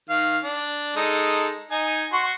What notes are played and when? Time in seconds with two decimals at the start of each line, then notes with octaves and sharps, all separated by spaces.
0.10 D#3 F5
0.44 D4
0.96 G#3 D#4 A4
1.71 D#4 G#5
2.13 F#4 C6 C#6